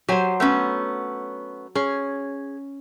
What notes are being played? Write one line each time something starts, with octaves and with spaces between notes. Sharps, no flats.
F#3 G4 C5 G#5
A3 B3 C#4
C#4 G#4